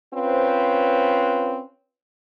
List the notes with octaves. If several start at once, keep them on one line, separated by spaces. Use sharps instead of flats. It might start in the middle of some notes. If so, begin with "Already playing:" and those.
C4 C#4 F4 B4 C5